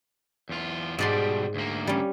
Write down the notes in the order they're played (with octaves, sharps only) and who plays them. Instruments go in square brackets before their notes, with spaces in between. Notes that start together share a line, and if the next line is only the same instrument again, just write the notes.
[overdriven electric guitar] E2 F4
[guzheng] G#2 D5 C6 [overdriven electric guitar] B2 G3
[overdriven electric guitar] D2 A#3
[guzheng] G3 C#4